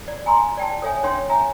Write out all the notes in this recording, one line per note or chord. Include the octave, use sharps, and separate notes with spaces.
D5
G#5 A#5 C6
D5 G5 A5
A4 C#5 D5 E5 G#5
C#4 D4 C#5 E5 G5 C6
C#5 E5 G#5 A#5